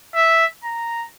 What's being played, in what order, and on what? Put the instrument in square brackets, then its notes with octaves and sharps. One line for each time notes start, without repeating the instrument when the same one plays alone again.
[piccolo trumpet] E5
A#5